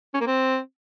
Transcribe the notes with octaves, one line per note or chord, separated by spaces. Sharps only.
C#4
A#3
C4